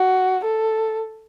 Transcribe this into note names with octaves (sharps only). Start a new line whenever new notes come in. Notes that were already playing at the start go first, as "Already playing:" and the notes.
Already playing: F#4
A4